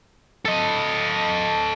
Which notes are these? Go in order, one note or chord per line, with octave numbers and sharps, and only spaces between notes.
A4 D#5